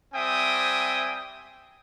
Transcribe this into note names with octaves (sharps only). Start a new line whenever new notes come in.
G3 C4 E5 G5 G#5 D#6